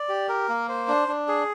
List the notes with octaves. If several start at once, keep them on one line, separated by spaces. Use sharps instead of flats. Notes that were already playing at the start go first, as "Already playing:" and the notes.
Already playing: D5
G4
A#4
A#3
C5
D4
D4
G#4